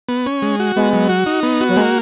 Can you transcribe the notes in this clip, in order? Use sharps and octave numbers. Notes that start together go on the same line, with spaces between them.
B3
C#4
G#3
F#4
G#3 B3
F#3
F#4
D#4
B3
F#4
F#3
G#3 A#3